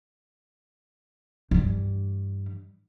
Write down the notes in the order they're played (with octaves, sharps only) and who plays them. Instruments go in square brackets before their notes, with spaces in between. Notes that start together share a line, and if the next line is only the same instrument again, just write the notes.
[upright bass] G2 E3